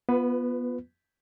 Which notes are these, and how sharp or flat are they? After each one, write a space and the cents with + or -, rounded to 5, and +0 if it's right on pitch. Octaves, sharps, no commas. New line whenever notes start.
B3 -15 F4 +0 B4 +20